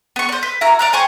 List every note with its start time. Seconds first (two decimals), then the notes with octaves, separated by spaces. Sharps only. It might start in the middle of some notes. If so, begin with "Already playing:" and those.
0.16 B3 C#6
0.29 C5 D5
0.43 B4
0.61 E4 F#4 A#4 A#5
0.79 D5 A#5 F#6
0.93 C5 G#5 C#6